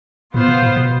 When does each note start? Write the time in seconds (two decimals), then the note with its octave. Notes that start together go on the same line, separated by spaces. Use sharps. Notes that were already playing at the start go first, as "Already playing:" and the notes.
0.34 A2 B3 F4 C5
0.48 B2
0.62 A2
0.76 B2